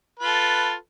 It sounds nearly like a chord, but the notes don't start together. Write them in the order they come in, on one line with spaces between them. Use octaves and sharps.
B4 F4 A4